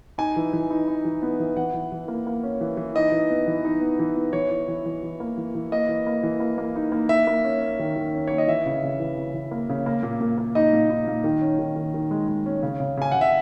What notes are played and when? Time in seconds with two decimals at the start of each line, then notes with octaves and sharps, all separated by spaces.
0.18 D#4 G#5
0.36 E3
0.53 E3
0.71 D#4
0.88 D#4
1.05 E3
1.22 B3
1.40 E3
1.57 E3 F#5
1.74 E3
1.92 E3
2.08 A#3
2.27 A#3
2.43 C#4
2.61 E3
2.77 E3
2.95 D#4 D#5
3.12 E3
3.30 B3
3.47 E3
3.65 D#4
3.81 B3
3.99 E3
4.16 B3
4.33 E3 C#5
4.51 E3
4.68 E3
4.86 E3
5.03 E3
5.20 A#3
5.37 E3
5.55 E3
5.72 A#3 D#5
5.89 E3
6.07 A#3
6.23 E3
6.40 A#3
6.58 A#3
6.76 D#4
6.92 A#3
7.09 A#3 E5
7.27 A#3
7.44 C#4
7.62 C#4
7.79 D#3
7.96 D#3
8.14 C#4
8.27 A#3 C#5
8.38 D#5
8.47 E3 E5
8.66 C#3
8.83 C#3
9.00 E3
9.17 C#3
9.34 E3
9.51 A#3
9.70 C#3
9.86 A#3
10.03 A#2
10.21 A#2
10.38 A#3
10.55 D#4 D#5
10.73 A#2
10.90 D#4
11.07 A#2
11.24 D#3
11.41 C#4
11.59 D#3
11.76 D#3
11.94 D#3
12.11 G#3
12.28 G#3
12.46 C#4
12.63 C#3
12.80 C#3
12.97 C#3 G#5
13.12 C#3 F#5
13.21 E5